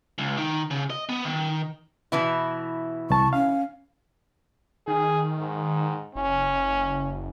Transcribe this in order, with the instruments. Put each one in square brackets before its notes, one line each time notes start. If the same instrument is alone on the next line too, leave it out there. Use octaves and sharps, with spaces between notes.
[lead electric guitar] C#2
D#3
C#3
D#5
B3
D#3
[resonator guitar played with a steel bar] B2 E3 E4
[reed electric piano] C2 A5 [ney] C#6
[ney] C#4 [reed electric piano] F5
[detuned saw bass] D#3 [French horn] G#4
[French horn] G#2
[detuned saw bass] F#1 [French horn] C#4